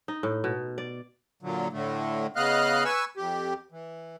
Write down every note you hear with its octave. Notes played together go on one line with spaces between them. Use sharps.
D#4
A2
B2
D5
A#2 D3 F#3
A2 D3 A3
C#3 B3 D#5 F5 F6 F#6
B4 G#5 C#6 E6
F2 G4
E3